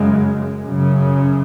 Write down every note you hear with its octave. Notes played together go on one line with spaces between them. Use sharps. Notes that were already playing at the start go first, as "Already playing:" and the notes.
Already playing: F#2 C#3 G#3
F#2 C#3